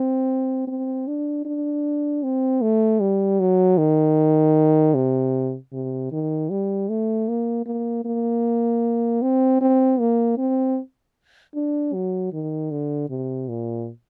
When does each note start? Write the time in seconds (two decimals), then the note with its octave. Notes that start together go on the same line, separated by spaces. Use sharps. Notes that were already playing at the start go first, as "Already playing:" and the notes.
Already playing: C4
0.68 C4
1.07 D4
1.45 D4
2.23 C4
2.62 A3
3.00 G3
3.40 F#3
3.78 D#3
4.95 C3
5.73 C3
6.12 D#3
6.50 G3
6.89 A3
7.28 A#3
7.66 A#3
8.05 A#3
9.22 C4
9.61 C4
10.00 A#3
10.38 C4
11.55 D4
11.93 F#3
12.33 D#3
12.71 D3
13.10 C3
13.48 A#2